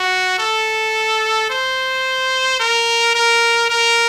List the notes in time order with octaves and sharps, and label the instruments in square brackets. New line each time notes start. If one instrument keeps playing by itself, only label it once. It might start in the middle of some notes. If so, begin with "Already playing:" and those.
Already playing: [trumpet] F#4
A4
C5
A#4
A#4
A#4